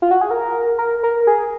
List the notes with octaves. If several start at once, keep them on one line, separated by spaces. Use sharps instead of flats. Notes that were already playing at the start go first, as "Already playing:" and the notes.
F4
F#4
G#4
A#4
A#4
A#4
G#4